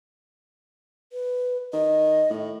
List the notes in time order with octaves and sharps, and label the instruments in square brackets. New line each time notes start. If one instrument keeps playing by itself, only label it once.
[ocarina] B4
[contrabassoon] D#3 [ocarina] D#5
[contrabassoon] A2